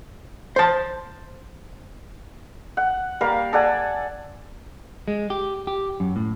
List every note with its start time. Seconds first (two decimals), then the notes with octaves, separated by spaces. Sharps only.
0.56 C5 A5
2.77 F#5
3.21 G3 A#3 A#4 F5
3.53 A4 D5 F#5 G#5
5.08 G#3
5.30 G4
5.67 G4
6.00 F#2
6.16 A2